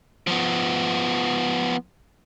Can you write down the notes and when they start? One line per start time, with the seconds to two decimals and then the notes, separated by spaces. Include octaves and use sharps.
0.27 F3 B3